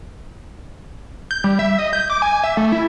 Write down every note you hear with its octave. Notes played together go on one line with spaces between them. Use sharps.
G6
G3
E5
D#5
G6
D6
G#5
E5
A3
E4